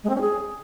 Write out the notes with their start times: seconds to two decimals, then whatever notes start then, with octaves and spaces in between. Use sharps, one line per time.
0.03 G#3
0.09 C4
0.15 C#4
0.20 G#4